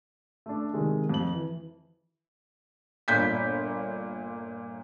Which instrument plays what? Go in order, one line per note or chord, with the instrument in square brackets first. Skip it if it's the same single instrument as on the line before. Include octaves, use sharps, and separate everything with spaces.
[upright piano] A3 D4
C3 D#3 G#3
F2 F#7
E3
[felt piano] G1 A#2 G6 B6